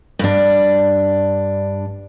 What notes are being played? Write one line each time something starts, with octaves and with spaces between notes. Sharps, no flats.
G2 D4